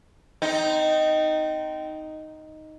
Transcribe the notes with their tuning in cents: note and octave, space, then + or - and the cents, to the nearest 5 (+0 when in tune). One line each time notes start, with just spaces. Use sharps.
C4 -25 D#4 +0